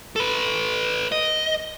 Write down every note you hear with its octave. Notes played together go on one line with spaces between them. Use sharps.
A4 B4
D#5